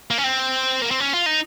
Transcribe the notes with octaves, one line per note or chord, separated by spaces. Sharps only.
A#3
C#4
C4
A#3
C4
C#4
F4
D#4